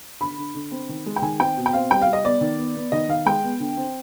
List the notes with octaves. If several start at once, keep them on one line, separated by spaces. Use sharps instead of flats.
D3 B5
D3
D3
C4
D#3
G#3
G5
D#3 G#5
C4 G5
B2
G5
C4 F5
G3 G5
F5
G3
D#5
B3 D5
D#3
B3
B3
D#3 D#5
D#3 F5
G#3 G5
B3
D3
C4